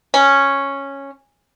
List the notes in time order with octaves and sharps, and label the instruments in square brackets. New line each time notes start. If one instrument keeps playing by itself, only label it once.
[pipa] C#4